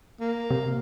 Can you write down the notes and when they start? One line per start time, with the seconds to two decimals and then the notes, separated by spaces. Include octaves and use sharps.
0.20 A#3
0.50 C3